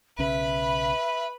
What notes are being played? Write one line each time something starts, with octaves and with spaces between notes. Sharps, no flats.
B1 C#3 C#4 B4 E5 B5